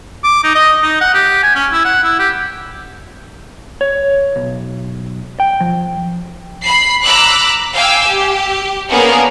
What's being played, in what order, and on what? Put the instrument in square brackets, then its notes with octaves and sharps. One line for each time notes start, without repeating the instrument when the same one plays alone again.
[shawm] D6
D#4
D#5
D#4
F#5
G4
G#5
C#4
E4
F#5
E4
G4
[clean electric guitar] C#5
B1
G5
F3
[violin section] B5 C7
A#5 B5 D6 E6 F#6
F5 G5 G#5 D6 E6
G4
A#3 B3 C#4 D4 G#4 A#4